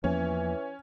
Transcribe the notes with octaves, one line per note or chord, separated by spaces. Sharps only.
E2 E3 F3 A#3 C#4